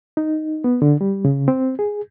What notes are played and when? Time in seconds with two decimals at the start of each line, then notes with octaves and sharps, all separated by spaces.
0.17 D#4
0.64 B3
0.82 D3
1.01 G3
1.25 C#3
1.48 C4
1.79 G#4